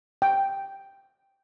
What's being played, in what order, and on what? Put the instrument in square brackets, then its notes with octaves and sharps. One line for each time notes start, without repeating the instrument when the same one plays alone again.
[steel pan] G5